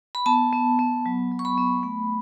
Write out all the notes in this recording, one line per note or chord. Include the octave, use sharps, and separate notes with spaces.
B5
B3 A5
B3
B3
F#3
F#3
C#6
B5
B3
A3